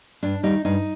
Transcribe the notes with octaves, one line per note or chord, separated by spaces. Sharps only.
G2 D4
D#3 G3 D#4
G2 D#4